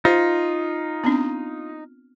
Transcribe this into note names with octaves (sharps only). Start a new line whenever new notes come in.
D#4 F4 C5
B3 C4 D4